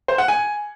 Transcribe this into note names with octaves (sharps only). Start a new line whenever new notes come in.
C5
F#5
G#5